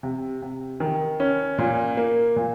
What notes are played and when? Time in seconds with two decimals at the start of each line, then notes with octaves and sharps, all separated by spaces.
0.03 C3
0.42 C3
0.80 D#3
1.20 C#4
1.58 A#2
1.97 A#3
2.36 A#2